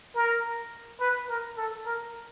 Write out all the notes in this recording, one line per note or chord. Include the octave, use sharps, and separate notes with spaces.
A#4
B4
A#4
A4
A#4